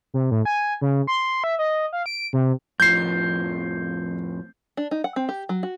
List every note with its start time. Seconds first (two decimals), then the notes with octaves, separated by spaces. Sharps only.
0.14 C3
0.31 A2
0.45 G#5
0.81 C#3
1.07 C6
1.44 E5
1.59 D#5
1.93 F5
2.06 D7
2.33 C3
2.80 F2 A2 F3 G6 C7
4.77 D4
4.91 D#4
5.04 F#5
5.16 C4
5.29 G4
5.49 F#3
5.63 F#4